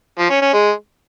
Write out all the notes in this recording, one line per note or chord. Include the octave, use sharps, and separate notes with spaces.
F3
C#4
C#4
G#3